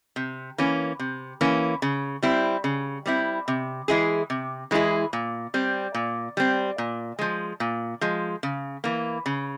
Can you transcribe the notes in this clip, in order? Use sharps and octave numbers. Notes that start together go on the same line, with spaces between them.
C3
E3 A#3 C#4
C3
E3 A#3 C#4
C#3
G3 C4 E4
C#3
G3 C4 E4
C3
E3 G#3 E4 G#4
C3
E3 G#3 E4 G#4
A#2
G3 C4
A#2
G3 C4
A#2
F3 G#3
A#2
F3 G#3
C#3
E3 A#3
C#3